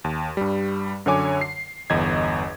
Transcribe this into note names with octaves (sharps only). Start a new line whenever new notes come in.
D#2
G2 G3
F#2 D3 F#3 C#5 G#5 D6
C7
G1 E2 D#5 G#6